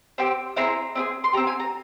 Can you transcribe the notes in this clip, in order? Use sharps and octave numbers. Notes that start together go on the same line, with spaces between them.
C4 G4
C4 E4 G#4 A#5
C4 E4 G#4
C6
C4 G4 A#5
G#5
A#5